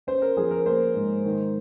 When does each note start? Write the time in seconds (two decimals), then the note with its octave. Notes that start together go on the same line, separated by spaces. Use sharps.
0.07 C#4 C5
0.22 A#4
0.37 F3 G#4
0.51 A#4
0.66 A#3 C5
0.95 G#2
1.25 D#3